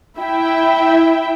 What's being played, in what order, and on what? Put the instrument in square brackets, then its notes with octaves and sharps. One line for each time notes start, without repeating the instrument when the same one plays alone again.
[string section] E4 E5 G5